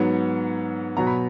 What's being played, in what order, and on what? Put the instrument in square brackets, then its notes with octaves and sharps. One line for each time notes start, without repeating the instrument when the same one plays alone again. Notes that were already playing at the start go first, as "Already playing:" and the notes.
Already playing: [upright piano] G#2 F#3 B3
B2 F#3 B3 A#5
B5